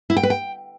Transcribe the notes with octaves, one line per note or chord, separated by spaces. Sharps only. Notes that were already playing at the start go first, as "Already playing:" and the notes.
E4
G5
B4
G5